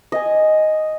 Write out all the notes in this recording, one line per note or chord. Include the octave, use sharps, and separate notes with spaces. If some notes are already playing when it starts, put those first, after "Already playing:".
D#5 G#5